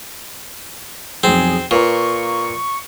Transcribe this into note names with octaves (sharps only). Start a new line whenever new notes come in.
B1 F2 C4 G#4
A#2 B4 F5 A#5 C#6